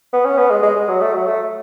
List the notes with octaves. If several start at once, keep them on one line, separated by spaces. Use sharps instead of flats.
B3
C#4
B3
G#3
G#3
G#3
F#3
A3
F#3
A3